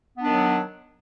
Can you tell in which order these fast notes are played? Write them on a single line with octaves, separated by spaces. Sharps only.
B3 D4 D#3 F#3